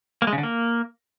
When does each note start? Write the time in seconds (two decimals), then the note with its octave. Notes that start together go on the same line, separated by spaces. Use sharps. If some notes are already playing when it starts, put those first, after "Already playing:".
0.22 A#3
0.27 G#3
0.33 C#3
0.38 D3
0.43 A#3